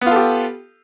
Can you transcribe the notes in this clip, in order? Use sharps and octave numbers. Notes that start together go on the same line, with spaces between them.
B3 F4 G4 A4